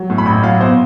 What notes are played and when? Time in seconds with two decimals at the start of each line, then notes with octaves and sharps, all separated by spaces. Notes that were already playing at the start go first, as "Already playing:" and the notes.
Already playing: F#3
0.10 A2
0.18 B5
0.26 A1
0.43 F#3 F5
0.60 B2 C5